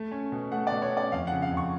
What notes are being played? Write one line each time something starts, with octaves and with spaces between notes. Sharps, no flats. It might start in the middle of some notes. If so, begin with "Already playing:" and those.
Already playing: A3
C#4
B2
A3 F#5
B2 D5
C#5
C#4
D5
F2 F5
C#3 F#5
F5
F2
C#6